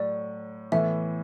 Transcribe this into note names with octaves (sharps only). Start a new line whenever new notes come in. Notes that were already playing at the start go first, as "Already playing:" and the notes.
Already playing: A2 F#3 D5
A2 E3 B3 E5